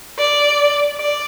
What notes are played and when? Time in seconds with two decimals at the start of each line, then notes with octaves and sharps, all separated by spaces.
0.18 D5
0.97 D5